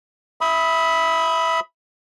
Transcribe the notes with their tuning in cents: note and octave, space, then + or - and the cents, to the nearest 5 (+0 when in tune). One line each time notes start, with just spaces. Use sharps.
E5 +0 B5 +0 D#6 +30